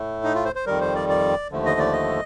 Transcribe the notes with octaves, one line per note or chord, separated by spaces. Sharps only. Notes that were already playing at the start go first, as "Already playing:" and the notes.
Already playing: A2 A3
D#4
F4
C5
C5
F2 D#3 G3 A#4
C5
D5
D5
D#2 D3 F3 A3
D#5
D5
D#5